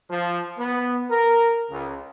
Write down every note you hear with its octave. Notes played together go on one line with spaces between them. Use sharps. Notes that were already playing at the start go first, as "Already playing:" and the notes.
F3
B3
A#4
C#2